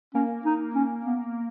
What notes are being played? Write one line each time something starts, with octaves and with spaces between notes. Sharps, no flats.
A#3 C#4
D#4
C#4
B3